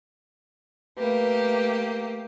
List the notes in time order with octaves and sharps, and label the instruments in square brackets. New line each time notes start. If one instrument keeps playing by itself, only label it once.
[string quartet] A3 A#3 G4 [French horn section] B4